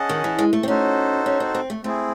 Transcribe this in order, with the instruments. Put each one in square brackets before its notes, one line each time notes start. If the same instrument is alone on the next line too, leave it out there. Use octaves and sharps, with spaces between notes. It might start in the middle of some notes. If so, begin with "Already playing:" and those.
Already playing: [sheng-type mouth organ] C#4 G#4 D#5 F#5 A5
[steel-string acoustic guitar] D#3
E3
G#3
A3
C4
[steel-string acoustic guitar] C#4 [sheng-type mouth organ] D#4 F#4 A4 C5
[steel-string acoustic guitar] C#4
C4
C4
A3
[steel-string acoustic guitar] A3 [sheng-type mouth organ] C4 E4 G#4